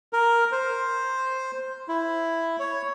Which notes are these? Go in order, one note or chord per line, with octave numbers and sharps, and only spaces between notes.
A#4
C5
E4
C#5